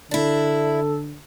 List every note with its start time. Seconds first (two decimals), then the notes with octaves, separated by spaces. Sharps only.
0.11 D3 D4 E4 A4